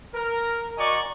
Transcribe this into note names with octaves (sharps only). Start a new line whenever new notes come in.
A#4
F#4 D5 D#5 G#5 A#5 C#6